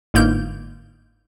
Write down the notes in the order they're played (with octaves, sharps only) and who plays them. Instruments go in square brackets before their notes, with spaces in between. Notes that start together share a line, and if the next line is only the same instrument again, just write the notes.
[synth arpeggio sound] G1 G#2 A#3 G6